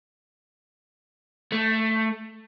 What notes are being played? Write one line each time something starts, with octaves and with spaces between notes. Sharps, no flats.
A3